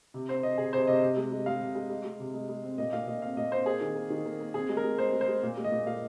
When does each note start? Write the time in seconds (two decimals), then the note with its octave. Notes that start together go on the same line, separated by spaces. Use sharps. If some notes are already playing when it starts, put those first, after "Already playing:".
0.14 C3
0.29 C4 C5
0.43 C4 D#5
0.58 C3 G#4
0.73 C3 C5
0.87 C3 D#5
1.02 C3
1.17 G#3
1.32 G#3
1.46 G#3 F5
1.61 C3
1.75 G#3
1.90 G#3
2.04 G#3
2.20 C3
2.34 G#3
2.49 G#3
2.63 C4
2.78 A#2 D#5
2.93 A#2 F5
3.07 A#2 D#5
3.22 C4 F5
3.37 A#2 D#5
3.52 C4 C5
3.66 A#3 G#4
3.81 D#3
3.96 A#3
4.10 D#3
4.25 A#3
4.40 A#3
4.54 C4 G#4
4.69 G#3
4.77 A#4
4.84 G#3
4.98 G#3 C5
5.13 G#3
5.21 C5
5.28 G#3
5.43 A#2
5.57 G#3
5.64 D#5
5.72 A#2
5.86 A#2 F5